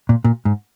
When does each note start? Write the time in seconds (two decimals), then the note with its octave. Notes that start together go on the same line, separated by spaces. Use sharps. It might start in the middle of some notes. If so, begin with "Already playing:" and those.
0.09 A#2
0.24 A#2
0.45 G#2